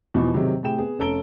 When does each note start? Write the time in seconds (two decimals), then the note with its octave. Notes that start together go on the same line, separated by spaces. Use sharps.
0.14 E2 B2 E3 F3 D#4
0.33 G#2 C3 D#3 F#3 G#3 C4
0.63 A2 C3 G#4 G5 E7
0.78 B3 G#4
0.99 F1 C#4 A4 A#5 D7 G7